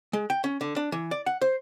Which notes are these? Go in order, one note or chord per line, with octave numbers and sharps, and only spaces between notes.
G#3
G5
C#4
D3
D4
E3
D5
F#5
C5